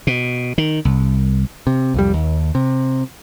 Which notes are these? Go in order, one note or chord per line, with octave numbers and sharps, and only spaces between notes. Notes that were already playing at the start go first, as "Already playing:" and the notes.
B2
D#3
C2
C3
C2 F2 G3
D#2
C3